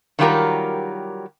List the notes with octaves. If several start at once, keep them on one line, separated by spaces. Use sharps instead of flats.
D#3 F#3 G3 F4 G4 A#4